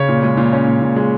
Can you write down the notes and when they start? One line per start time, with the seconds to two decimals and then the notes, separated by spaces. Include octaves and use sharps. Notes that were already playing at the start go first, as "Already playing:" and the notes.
Already playing: C#3 C#5
0.09 A#2
0.23 G#3
0.37 A#2
0.53 C#4
0.67 A#2
0.82 A#2
0.96 G#3